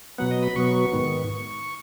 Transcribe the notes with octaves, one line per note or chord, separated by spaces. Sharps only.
B2 F#3 B3 F#5
D#5
B5
B2 F#3 B3 C#6
G#2 D#3 B3